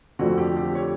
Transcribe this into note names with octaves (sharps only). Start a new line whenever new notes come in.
F2 D3 F3 A3 F#4
G4
G4
C#5